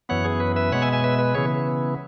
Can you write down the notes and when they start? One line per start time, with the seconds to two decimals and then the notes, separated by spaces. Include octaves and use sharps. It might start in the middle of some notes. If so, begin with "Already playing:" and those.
0.09 F#2 E3 B3 C#5 F#5
0.25 G#4
0.40 B4
0.56 B4 E5
0.72 B2 G#3 B3 C#5 F#5
0.82 E5 G#5
0.92 E5 G#5
1.04 B4 E5
1.19 B4
1.34 C#3 E3 B3 G#4 C#5